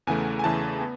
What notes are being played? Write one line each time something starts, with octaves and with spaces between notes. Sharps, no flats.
E2 C#3 E3 A3 G#5
G#5
E2 C#3 E3 A3 A5
B3